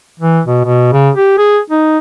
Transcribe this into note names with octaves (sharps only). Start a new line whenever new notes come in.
E3
B2
B2
C#3
G4
G#4
D#4